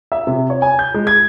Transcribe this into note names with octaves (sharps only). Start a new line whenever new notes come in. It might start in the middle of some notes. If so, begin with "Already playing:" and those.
E5
C3
C#5
G#5
G6
G#3
G#6